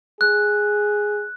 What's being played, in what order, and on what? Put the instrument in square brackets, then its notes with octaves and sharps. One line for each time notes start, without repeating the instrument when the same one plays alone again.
[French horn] G#4 [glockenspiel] F#6